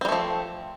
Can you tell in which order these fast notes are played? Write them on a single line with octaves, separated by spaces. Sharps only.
C4 G3 A3 F3